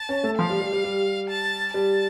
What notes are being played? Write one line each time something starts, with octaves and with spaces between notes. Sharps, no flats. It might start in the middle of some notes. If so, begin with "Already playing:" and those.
Already playing: A5
C#4
A3
F3 F5
G3
G3
G3
G3
A5
G3 A5